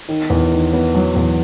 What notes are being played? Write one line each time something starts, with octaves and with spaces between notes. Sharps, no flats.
D#3
E2
D#3
B3
F#3
E2